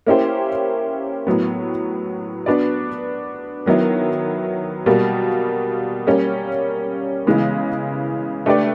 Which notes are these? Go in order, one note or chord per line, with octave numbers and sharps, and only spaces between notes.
A#3 C#4 E4 G4 C5
A2 F#3 B3
B3 D4 F#4 B4 D5
D#3 F#3 B3 E4
B2 G3 A#3
G3 A#3 C#4
C#3 E3 G#3 B3
A3 D4 G4 B4 D5